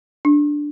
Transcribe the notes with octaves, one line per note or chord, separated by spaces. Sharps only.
D4